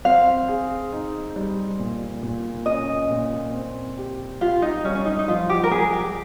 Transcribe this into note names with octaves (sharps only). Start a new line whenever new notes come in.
C4 F5
G#4
D#4
G3
A#2
A#2
C#4 D#5
A#2
C4
G4
F4 G4
D#4
G3 C#4
C#4
D#4
D#4
F3 F4
G4
A#4
G#3 G#4
G4